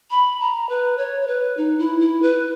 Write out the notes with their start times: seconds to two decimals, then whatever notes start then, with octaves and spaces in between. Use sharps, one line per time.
0.11 B5
0.41 A#5
0.69 B4
0.98 C#5
1.21 C#5
1.27 B4
1.57 D#4
1.79 E4
2.00 E4
2.22 B4